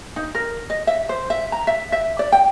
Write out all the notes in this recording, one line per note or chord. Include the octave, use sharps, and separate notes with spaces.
D#4
A#4
D#5
E5
C5
E5
A#5
E5
E5
D5
G5